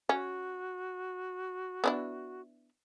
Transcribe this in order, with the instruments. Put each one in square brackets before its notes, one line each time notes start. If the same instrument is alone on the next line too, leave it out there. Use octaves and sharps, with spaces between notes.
[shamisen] C#4 [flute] F#4
[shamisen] B3 D4 E4